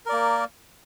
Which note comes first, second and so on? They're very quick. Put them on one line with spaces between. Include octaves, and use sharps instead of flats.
A#4 D5 A#3